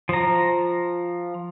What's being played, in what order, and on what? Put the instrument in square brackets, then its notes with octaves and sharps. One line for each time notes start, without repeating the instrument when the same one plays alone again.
[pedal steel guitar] F3 A#5